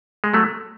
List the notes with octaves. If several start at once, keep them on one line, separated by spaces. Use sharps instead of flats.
G#3
F#3 A3